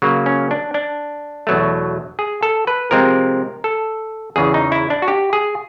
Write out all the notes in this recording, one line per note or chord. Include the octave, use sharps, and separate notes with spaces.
C#3 F#3 A#3
C#4
D4
D4
E2 B2 F#3 A3
G#4
A4
B4
C3 F3 G#3 C4 A#4
A4
E2 C#3 E3 G#4
D#4
E4
D4
F#4
G4
G#4